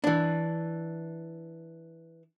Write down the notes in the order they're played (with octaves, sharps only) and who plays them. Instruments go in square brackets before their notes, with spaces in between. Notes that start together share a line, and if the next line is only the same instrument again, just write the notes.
[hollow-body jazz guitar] E3 D4